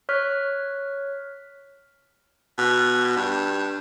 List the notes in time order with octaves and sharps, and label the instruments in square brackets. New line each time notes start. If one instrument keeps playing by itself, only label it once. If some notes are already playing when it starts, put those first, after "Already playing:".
[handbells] C#5 C#6 F6 F#6 B6
[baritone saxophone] B2
G2